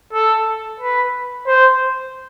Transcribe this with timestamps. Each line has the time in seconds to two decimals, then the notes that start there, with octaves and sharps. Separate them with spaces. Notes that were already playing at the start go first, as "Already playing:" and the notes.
0.13 A4
0.80 B4
1.47 C5